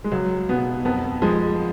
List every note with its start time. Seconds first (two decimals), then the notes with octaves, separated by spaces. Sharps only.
0.04 G#3
0.12 C#2 F#3
0.49 B2 B3
0.85 F2 B3
1.22 F3 G#3